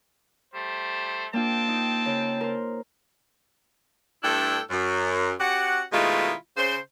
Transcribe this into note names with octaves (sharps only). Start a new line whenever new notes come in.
G3 A3 C5
A#3 C4 D4 F4 G5 A5
D#4
C#3 A#4
A#4 C5
G2 A3 D4 E4 A4 G5
F#2
C#4 F#4 G4 F#5
B2 D#3 G#3 A3 E4 F4
C#3 C5